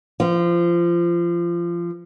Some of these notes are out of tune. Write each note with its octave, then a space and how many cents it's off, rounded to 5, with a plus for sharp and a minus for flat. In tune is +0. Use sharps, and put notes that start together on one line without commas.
F3 -25